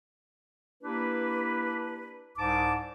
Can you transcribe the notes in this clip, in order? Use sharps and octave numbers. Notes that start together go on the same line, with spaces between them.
A#3 D4 E4 G4 B4
C2 G#2 A5 D6